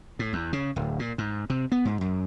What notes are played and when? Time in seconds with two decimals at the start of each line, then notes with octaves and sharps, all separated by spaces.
0.19 A2
0.33 E2
0.53 C#3
0.76 D1
0.99 A#2
1.18 G#2
1.50 C3
1.72 B3
1.85 G#2
2.01 F#2